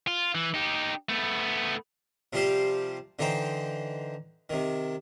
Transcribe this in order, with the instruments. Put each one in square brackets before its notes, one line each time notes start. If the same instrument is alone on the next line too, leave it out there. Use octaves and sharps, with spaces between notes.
[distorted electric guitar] F4
E3
D#4 G4
A3 B3
[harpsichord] C3 F3 G3 G4 C5 F5
D3 E3 D#4 C5 G5
C3 D#3